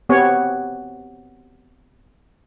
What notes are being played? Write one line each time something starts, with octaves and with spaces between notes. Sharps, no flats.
B3 C4 G4 C#5